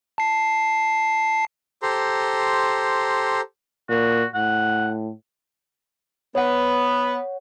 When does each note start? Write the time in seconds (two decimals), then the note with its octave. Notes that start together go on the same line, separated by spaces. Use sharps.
0.18 A5 C7
1.83 G4 A4 C5 A#5 C6
3.89 A#2 F#4
4.35 A2 F#5
6.35 B3 C#5 F#5